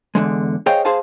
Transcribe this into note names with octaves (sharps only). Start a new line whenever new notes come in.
E2 D3 G#3
G#4 C5 C#5 D#5 F5 G5
G#4 C5 F5 G#5 A5